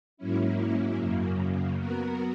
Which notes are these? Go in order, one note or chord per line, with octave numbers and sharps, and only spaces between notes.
G#2 F#3 A#3 C#4 E4
F#2 C#3 F#3 A#3
F#3 B3 F#4 A#4